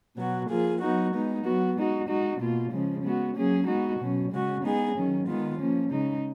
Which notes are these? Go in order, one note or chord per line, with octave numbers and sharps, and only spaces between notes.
B2 F#3 B3 F#4
F3 A#3 F4 G#4
F#3 B3 D#4 F#4
G#3 B3 D#4
F#3 B3 F#4
G#3 D#4 F#4
G#3 D#4 F#4
B2 A#3 F4
C#3 F3 G#3
G#3 B3 F#4
F#3 A#3 C#4 G#4
G#3 B3 D#4 F#4
B2 F#3 C#4
C#3 G#3 C#4 F#4
G#3 B3 D#4 G#4
D#3 F#3 C#4
D#3 G#3 B3 F4
F3 A#3 C#4
C#3 G#3 D#4